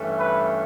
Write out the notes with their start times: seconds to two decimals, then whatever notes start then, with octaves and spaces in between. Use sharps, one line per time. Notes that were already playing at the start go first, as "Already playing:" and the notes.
Already playing: G2 E3 A3 C#4
0.18 B4